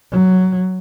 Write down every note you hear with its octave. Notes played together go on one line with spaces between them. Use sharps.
F#3